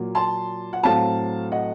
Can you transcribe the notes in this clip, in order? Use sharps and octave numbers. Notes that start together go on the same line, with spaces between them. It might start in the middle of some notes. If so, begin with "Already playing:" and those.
Already playing: A#2 F#3 A#3
A5 C6
F#5
A2 F#3 C4 F5 A5
D#5 F#5